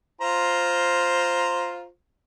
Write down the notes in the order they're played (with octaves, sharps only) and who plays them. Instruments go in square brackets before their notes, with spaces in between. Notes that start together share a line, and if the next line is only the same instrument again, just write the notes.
[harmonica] F4 C5 A#5